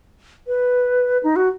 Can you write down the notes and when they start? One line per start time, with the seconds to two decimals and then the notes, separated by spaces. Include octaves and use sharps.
0.47 B4
1.23 D#4
1.36 F#4